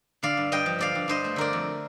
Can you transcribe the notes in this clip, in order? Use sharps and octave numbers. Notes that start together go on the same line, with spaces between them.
D3 D5 F5
G2
G2 D#5 G5
F3
D3 D5 F5
G2
G2 C5 D#5
A3
D3 A#4 D5
F2